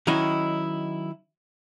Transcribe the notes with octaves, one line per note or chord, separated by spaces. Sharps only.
D#3 F#3 C#4 D#4 E4